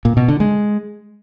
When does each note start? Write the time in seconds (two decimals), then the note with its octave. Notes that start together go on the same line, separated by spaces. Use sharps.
0.05 A#2
0.17 B2
0.28 D3
0.40 G#3